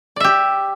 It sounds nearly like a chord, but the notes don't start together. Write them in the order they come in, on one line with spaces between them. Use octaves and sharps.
D5 E5 G4